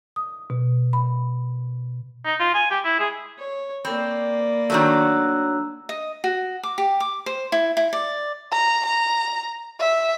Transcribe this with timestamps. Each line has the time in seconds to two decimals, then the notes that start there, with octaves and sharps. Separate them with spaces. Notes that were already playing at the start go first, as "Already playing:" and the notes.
0.16 D#6
0.50 B2
0.93 B5
2.25 D#4
2.40 F4
2.54 G#5
2.70 G4
2.85 E4
3.00 G#4
3.38 C#5
3.85 A#3 C4 D5 B5
4.70 D#3 F#3 A3 D4 A#5 E6
5.89 D#5
6.24 F#4
6.63 D6
6.78 G4
7.00 D6
7.26 C5
7.52 E4
7.77 E4
7.93 D5
8.52 A#5
8.86 A#5
9.80 E5